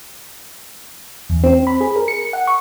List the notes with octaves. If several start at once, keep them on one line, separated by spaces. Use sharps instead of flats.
E2
C4
B5
G#4
A#4
C#7
F#5
C#6